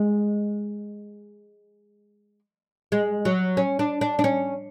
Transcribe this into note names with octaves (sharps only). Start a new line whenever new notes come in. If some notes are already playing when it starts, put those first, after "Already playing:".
Already playing: G#3
G#3
F#3
C#4
D4
D4
D4
C#4